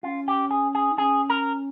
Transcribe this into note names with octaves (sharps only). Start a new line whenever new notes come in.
C#4 F4
G4
G#4
G#4
D#4
C#4 G#4
A#4